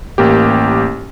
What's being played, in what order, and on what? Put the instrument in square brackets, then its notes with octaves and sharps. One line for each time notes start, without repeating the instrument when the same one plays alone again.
[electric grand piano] A1 A#3 G4